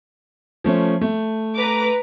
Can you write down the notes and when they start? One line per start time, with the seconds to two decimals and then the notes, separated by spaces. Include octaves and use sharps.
0.64 F3 A3 C#4
1.01 A3
1.57 B4 A#5 D6